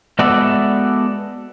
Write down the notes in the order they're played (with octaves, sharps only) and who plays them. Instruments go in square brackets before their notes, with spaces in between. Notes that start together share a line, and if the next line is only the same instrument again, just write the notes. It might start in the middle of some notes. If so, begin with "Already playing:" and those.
[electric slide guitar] G#3 B3 F#4 A4 D5 E5